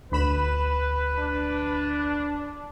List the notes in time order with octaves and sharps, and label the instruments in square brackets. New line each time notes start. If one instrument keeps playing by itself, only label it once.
[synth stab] D2 B5 E7 [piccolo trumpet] B4
[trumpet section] D4